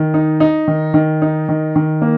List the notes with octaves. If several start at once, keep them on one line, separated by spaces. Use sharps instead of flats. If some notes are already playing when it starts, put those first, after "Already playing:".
Already playing: D#3
D#4
D#4
D#3
D#3
D#4
D#3
D#3
A#3